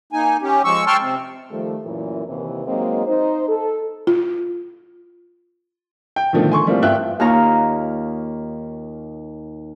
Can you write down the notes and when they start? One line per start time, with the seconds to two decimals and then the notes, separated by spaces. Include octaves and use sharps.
0.13 A#3 D#4 G#5
0.42 C#4 G4
0.64 F3 G#3 C#6 E6
0.87 G5 A5 C6 C#6 E6 F6
1.01 C3 C4
1.50 D#3 F3 G3 A3
1.84 F#2 A#2 E3
2.26 D#2 C3 E3
2.65 F#3 G#3 A#3 C4 D#4
3.06 D#4 C5
3.48 A4
4.07 F4
6.16 G5
6.33 B2 D3 D#3 F3 A3
6.52 G#5 C6 C#6
6.66 E3 G3 A3 A#3 C4 F4
6.82 G2 B3 F4 E5 G5 F#6
7.20 D#2 D#4 F4 C#5 A#5